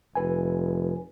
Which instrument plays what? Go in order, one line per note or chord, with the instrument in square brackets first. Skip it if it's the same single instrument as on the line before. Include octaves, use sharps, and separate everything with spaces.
[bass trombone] F1 [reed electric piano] B4 G#5